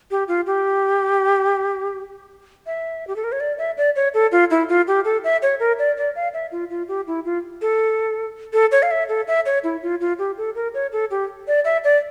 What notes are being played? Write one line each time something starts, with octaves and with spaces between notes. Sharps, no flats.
G4
F4
G4
E5
G4
A4
A#4
C#5
D5
E5
D5
C#5
A4
F4
E4
F4
G4
A4
E5
C#5
A#4
D5
D5
F5
E5
F4
F4
G4
E4
F4
A4
A4
C#5
F5
E5
A4
E5
C#5
E4
F4
F4
G4
A4
A#4
C#5
A4
G4
D5
E5
D5